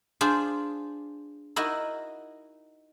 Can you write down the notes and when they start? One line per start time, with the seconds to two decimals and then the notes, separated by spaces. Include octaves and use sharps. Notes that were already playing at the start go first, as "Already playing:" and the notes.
0.21 D4 F4 G#4 C5
1.56 D#4 E4 F#4 A#4